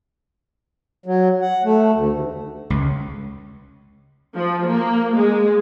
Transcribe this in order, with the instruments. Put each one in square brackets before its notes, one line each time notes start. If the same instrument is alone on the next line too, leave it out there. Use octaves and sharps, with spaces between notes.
[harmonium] F#3
F#5
A3
D2
D#2
[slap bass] C#2
[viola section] F3
A#3
G#3